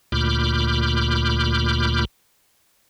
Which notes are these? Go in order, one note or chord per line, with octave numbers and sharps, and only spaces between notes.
D2 A#2 B5 D6 F6 G6